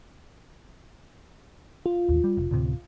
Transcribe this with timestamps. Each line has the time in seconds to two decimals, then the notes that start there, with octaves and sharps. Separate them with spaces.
1.86 F4
2.09 A1 D#2
2.24 G3
2.37 F1
2.51 D2 A2 C3